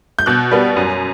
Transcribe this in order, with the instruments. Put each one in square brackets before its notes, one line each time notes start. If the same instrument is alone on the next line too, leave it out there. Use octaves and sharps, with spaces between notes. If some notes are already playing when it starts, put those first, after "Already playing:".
[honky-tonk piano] G6
B2 F#6
G3 B3
F#2